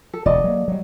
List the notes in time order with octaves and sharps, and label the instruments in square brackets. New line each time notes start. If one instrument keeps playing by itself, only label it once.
[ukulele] A4
[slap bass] E1 D2 [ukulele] A4 D5 D#5
[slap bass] F#3 A#3
F#3 G3